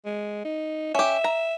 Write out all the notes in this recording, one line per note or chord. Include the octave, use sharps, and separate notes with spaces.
G#3
D#4
C#4 G4 E5
A#5